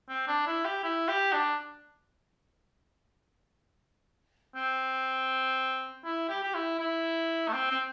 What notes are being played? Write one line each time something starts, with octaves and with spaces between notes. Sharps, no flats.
C4
D4
E4
G4
E4
G4
D4
C4
E4
G4
G4
E4
E4
A3
C4
C4